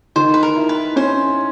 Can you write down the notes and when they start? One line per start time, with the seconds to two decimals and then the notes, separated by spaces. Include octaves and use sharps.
0.16 D#3 C5
0.34 B4
0.43 A#4
0.56 E4
0.69 B4
0.96 C#4 C5